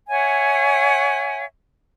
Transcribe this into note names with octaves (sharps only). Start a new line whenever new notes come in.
C#5 E5 F#5 G#5